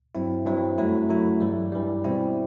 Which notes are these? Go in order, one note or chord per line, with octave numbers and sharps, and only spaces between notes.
G2 F#3 C4 E4
G2 F#3 C4 E4
F#2 F#3 A3 E4
F#2 F#3 A3 E4
G2 E3 G3
G2 E3 G3
B2 G3 C4 E4